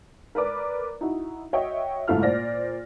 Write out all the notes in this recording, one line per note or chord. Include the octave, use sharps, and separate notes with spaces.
A#4 B4 D5 D6
D#4 E4 F#4
F#4 C#5 D#5 E5 G5
F#1 G#2 A3 E4 F4 F6
A#2 C5 D5 A#6